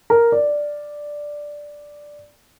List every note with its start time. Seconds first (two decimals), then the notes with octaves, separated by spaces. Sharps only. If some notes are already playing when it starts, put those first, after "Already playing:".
0.10 A#4
0.32 D5